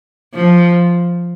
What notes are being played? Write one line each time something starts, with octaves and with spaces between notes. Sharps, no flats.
F3